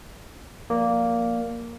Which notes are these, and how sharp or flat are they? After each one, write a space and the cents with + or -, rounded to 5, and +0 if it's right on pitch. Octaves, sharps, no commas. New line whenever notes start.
F3 +15 A#3 +0 D5 -10